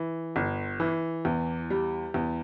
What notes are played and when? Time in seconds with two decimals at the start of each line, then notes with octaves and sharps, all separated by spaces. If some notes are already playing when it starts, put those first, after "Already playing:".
Already playing: E3
0.36 G1
0.80 E3
1.25 E2
1.70 G3
2.14 E2